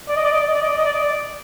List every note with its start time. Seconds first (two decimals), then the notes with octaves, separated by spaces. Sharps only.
0.08 D5
0.16 D#5
0.24 D5
0.32 D#5
0.40 D5
0.47 D#5
0.54 D5
0.61 D#5
0.69 D5
0.77 D#5
0.85 D5
0.93 D#5
1.00 D5